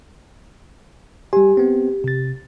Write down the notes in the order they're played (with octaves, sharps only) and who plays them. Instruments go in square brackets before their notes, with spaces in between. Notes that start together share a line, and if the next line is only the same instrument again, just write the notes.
[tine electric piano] G3 G#5 [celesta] G4
[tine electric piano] B3 C4
C3 A6